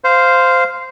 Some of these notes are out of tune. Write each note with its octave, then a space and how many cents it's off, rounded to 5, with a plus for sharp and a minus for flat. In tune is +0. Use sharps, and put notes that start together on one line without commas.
C5 -10 F5 +0